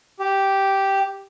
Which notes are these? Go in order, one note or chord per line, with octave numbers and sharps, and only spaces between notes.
G4